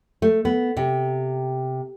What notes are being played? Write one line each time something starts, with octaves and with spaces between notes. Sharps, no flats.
A3
B3
C3